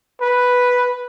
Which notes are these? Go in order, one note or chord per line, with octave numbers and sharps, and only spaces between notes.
B4